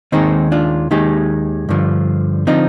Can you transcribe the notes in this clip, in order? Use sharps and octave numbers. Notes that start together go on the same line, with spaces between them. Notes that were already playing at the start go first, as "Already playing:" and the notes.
D#2 D#3 G#3 C4 D#4
D4 F4
D#2 D#3 G#3 D#4 G4
G2 D3 F3
D3 F3 C4 D#4